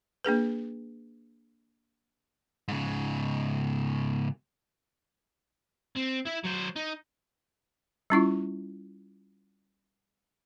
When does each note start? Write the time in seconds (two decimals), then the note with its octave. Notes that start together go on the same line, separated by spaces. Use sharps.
0.25 A#3 D4 G#4 B4
2.68 G#2 C#3
5.97 C4
6.27 E4 E5
6.45 F#3 C5
6.76 D#4
8.10 G3 C#4 E4 F4